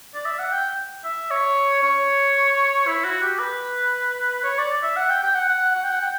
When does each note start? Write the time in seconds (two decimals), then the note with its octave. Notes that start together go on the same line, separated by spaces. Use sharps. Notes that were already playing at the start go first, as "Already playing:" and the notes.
0.15 D5
0.25 E5
0.39 F#5
0.52 G5
1.05 E5
1.30 C#5
1.83 C#5
2.87 E4
3.05 F#4
3.22 G4
3.39 B4
4.44 C#5
4.58 D5
4.83 E5
4.97 F#5
5.09 G5
5.23 G5
5.35 F#5
5.49 F#5
5.75 F#5
5.84 G5
5.92 F#5
6.01 G5